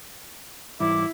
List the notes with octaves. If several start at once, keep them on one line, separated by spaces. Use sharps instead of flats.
G#2 E3 G3 E4 D6